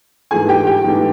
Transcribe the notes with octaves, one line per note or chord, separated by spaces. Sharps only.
G#2 E3 A3 D4 G#4 G#5
G4 G5
G4 G5
G#2 E3 A3 D4